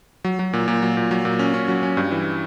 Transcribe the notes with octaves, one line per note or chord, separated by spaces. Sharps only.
F#3
F#3
A#2
A#2
F#3
A#2
F#3
A#2
C#4
C#4
F#3
C#4
G2
E3